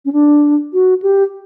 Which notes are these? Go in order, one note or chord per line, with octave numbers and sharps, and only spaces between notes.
C#4
D4
F#4
G4